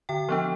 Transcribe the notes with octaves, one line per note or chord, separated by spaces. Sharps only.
D3 G5
F3 B3 D4